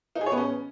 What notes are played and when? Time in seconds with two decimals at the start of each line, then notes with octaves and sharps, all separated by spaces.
0.15 D#4
0.21 G#4
0.26 C#5
0.32 B3
0.37 C#4